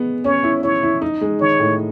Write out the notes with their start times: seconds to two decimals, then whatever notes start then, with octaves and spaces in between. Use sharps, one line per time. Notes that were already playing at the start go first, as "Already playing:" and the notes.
Already playing: G#3 B3
0.25 C#4 C#5
0.43 E4
0.63 E4 C#5
0.83 E4
1.02 D#4
1.21 G#3
1.41 D#3 C#5
1.60 A2